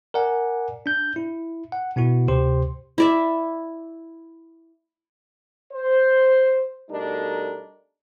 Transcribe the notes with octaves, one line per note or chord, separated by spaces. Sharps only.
A#4 D5 F#5 G#5
D4 G6
E4
F#5
B2 B3 E4 F#4
D2 C3 G4 C5 C6
E4 D5 E5
C5
B2 G3 A3 D4 D#4 A#4